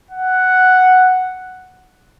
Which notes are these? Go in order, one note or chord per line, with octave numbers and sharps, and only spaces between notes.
F#5